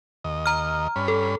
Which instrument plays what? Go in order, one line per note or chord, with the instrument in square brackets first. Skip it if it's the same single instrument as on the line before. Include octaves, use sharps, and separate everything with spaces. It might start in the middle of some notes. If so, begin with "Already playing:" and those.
[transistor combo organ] D#2 D#5
[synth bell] A#5 F6
[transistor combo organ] G2 C#4 B5
[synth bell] A4